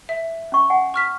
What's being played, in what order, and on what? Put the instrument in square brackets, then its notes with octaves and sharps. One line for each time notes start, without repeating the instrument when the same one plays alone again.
[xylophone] E5
[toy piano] C#4 C#6
F#5 G#5
[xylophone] C#6 F6 B6